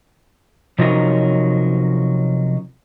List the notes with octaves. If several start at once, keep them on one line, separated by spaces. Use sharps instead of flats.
C3 F3 F#3 C#4 D#4 A#4